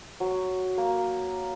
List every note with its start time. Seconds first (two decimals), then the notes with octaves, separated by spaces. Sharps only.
0.20 F#3
0.78 A#3